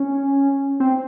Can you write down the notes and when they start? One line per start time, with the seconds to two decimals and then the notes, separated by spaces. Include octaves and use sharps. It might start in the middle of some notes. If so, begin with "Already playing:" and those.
Already playing: C#4
0.80 C4